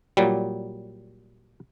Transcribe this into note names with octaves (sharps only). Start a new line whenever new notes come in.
A#2 F#3 G3